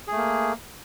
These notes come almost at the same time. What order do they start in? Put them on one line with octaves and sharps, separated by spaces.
G#4 A3 A#3